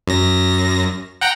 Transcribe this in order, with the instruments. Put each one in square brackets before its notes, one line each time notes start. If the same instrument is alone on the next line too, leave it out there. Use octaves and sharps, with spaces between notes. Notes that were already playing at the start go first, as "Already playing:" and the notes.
[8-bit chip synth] F#2 A#6
F#5 G5 A#5